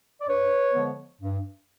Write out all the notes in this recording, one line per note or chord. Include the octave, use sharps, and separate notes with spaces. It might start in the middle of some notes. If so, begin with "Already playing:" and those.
D5
G2 B4 C#5
D3 F3 G#3 B3
G2